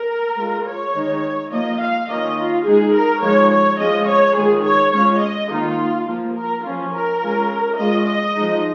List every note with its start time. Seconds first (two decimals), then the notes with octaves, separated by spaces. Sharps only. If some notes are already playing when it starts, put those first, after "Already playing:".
Already playing: A#4
0.38 G#3 F4
0.66 C#5
0.95 D#3 G#3 D#4
1.51 F3 A#3 F4 D#5
1.80 F5
2.08 D#3 A#3 C#4 F4 D#5
2.37 F4
2.65 G#3 D#4 G#4
2.94 A#4
3.22 F3 G#3 D#4 C#5
3.51 C#5
3.79 F3 G#3 C#4 D#5
4.08 C#5
4.36 D#3 G#3 F4 G#4
4.65 C#5
4.93 G#3 C#4 F4 C#5
5.21 D#5
5.50 D#3 A#3 D#4 F4
6.07 F3 A#3 F4
6.36 A#4
6.64 F3 C#4 F4
6.93 A#4
7.21 G#3 C#4 F4
7.78 G#3 C#4 F4 D#5
8.07 D#5
8.35 F3 G#3 D#4